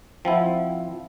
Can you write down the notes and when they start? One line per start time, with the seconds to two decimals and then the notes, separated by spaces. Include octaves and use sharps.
0.25 F3 C4 E4 E5 F#5 G5